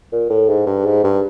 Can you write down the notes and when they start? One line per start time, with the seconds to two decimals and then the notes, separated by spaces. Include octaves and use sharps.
0.12 A#2
0.30 A2
0.49 G#2
0.66 G2
0.85 G#2
1.04 G2